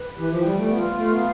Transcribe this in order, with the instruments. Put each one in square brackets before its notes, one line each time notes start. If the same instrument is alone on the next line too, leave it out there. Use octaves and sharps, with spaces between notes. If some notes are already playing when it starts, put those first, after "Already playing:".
Already playing: [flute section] B4
G4
[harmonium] E3
F3
[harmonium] G3 [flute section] G5
[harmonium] A3
[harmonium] B3 [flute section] F4
[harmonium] A3 [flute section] F5
[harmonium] B3